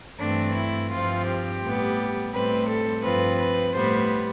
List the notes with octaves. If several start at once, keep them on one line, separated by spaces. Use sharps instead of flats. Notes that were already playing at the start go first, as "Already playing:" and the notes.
G2 E3 A3 C4 D4
E4
G2 F3 C4 F4
G4
A2 G3 B3
A2 G3 C4 B4
A4
G2 F3 C4 B4
B4
A2 G3 B3 C5